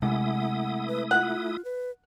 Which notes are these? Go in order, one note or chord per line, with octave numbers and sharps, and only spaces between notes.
C3 G#3 A3 E4 F#5 D#6
B4
F4 F#5
B4